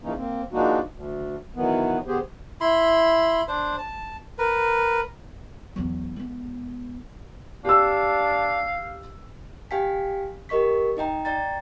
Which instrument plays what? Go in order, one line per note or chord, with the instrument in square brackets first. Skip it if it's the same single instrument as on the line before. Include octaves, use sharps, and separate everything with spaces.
[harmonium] C#3 E3 F3 A#3 C#4 D#4
A#3 C4
F3 G#3 A#3 D4 D#4 F#4
D2
D#3 E3 F#3 B3
D3 B3 G4 G#4 C5
[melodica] E4 B5 C6
D4 C5
A5
A#4 B4
[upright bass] E2 F#3
G#3 B3
[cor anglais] D4 [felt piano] G4 E6 [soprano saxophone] F5
[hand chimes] G4 F5 G5 G#5 B6
G4 A#4 D#5 C#6 B6
D#4 D#5 G5 A#5
D5 G5 A#5 A6